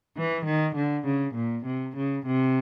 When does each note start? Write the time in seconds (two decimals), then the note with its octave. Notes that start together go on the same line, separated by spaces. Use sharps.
0.16 E3
0.45 D#3
0.75 D3
1.04 C#3
1.34 A#2
1.65 C3
1.95 C#3
2.24 C3